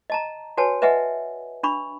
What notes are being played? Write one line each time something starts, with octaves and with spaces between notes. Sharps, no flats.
D#5 A5 A#5
F#4 B4 C#5 G#5 A5
B4 D#5 E5 F#5 G#5
D4 B5 C#6